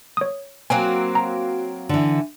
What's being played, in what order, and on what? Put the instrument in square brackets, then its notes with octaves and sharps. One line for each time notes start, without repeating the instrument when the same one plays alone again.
[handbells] C#5 D#6
[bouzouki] F#3 A#3 C4 [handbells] G#5
[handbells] A#5
[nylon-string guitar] D3 E3